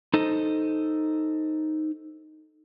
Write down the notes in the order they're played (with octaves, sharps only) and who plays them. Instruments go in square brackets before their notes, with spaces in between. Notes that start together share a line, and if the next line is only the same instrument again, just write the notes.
[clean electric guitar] D#4 A4 C5 D#5